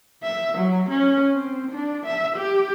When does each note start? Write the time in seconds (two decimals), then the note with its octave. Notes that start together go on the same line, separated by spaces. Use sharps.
0.23 E5
0.57 F#3
0.89 C#4
1.34 C4
1.71 D4
2.06 E5
2.36 G4